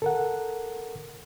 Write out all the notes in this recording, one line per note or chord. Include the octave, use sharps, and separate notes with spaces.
A4 A#4 F#5